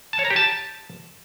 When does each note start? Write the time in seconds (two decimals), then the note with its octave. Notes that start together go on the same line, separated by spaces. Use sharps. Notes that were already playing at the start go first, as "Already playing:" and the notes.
0.13 A5
0.19 C#5
0.25 A#5
0.30 G4
0.36 A5